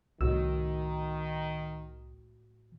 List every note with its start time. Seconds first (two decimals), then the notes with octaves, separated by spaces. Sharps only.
0.21 C2 A2 D#3 F#4 E6